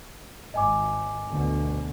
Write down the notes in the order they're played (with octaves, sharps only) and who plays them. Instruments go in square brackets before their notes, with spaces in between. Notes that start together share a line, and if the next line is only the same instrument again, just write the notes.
[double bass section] G#1 [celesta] D#5 G#5 D6
[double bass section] D2 B2 D3